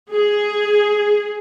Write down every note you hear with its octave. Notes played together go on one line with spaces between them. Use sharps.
G#4